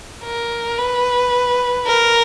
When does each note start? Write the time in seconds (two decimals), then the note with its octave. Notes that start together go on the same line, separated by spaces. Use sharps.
0.24 A#4
0.78 B4
1.87 A#4